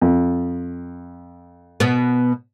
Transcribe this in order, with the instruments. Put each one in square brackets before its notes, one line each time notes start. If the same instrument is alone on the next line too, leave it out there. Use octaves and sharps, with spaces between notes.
[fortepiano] F2
[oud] B2 B3